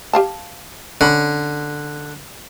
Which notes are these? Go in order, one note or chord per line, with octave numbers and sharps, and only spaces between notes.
G4 F5 A5
D3 C#4 B5